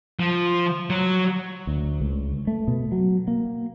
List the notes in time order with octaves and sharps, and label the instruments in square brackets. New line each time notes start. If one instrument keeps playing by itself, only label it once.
[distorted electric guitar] F3
F#3
[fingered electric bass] D2
C#2
A3
B2
F#3
A#3